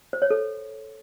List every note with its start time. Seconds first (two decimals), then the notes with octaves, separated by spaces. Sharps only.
0.13 C5
0.22 C#5
0.30 A4